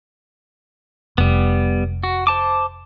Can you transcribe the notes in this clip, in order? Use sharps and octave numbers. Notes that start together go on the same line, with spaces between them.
F1 G3 B3
F#4
C5 A5 D6